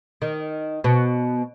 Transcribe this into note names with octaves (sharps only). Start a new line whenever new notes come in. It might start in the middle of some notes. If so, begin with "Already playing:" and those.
D#3
B2